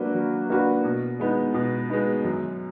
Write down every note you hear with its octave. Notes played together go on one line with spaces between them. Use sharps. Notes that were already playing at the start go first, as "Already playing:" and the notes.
Already playing: F#3 A#3 D4 F#4 B4
F#3
A#3 D4 F#4 B4
B2
G#3 B3 D#4
B2
G#3 B3 D#4
F#2